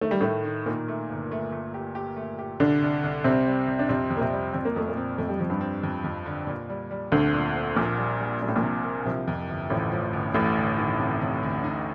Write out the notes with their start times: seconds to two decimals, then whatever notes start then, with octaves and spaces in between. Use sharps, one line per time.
0.01 D#3 A3
0.11 G3
0.20 A2 D#3 A3
0.44 D#3
0.66 A#2 D#3 A#3
0.88 A3
1.10 G1
1.31 A3
1.52 A3
1.74 G4
1.95 G4
2.16 A3
2.39 G4
2.60 C2 D3 D4
2.82 C2
3.04 C2
3.24 C3 G3 C4
3.47 G3
3.68 C2
3.79 D4
3.89 F2 C3 C4
4.10 F2
4.17 A#3
4.21 C3 C4
4.32 G3
4.53 F2 C4
4.65 A#3
4.76 F2 A3
4.88 A#2 A#3
4.96 C4
5.18 F2 A3
5.29 G3
5.39 F2 F3
5.50 G2 G3
5.61 C4
5.83 F2
6.04 F2
6.26 D3
6.47 A#2
6.70 G3
6.91 G3
7.11 D2 D3 C4
7.34 A#2
7.55 C4
7.76 A#1 A#2 A#3
7.98 G3
8.20 G3
8.41 A#2 G3
8.48 A2
8.56 A#1 A#2
8.63 C3
8.84 A#3
9.05 C2 C3 F3
9.27 F2
9.48 G1
9.70 A1 A2 F3
9.92 F3
10.13 G1
10.34 A1 D2 A2
10.57 D2
10.78 D#3
11.00 C3
11.21 C3
11.43 D2
11.64 D#4